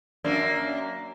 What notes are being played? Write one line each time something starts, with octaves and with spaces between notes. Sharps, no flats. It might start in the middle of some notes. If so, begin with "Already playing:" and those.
F#2 A#3 D4